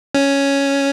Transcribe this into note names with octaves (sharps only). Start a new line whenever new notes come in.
C#4